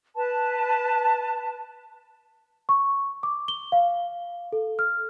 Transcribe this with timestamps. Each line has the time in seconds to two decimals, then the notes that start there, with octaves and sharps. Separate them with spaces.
0.15 B4 A5
2.69 C#6
3.23 D6
3.48 G7
3.72 F5
4.52 A4
4.79 F6